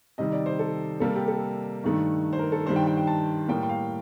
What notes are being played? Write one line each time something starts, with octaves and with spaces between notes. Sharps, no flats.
C3 D#3 G3 D#5
D5
C5
A4
C3 G3 A#3 A4
G4
A4
G2 D#3 A3
C5
A#4
A4
G2 D#3 G3 C5
G5
G5
G5
A5
A2 G3 A#3 G5
G5
F5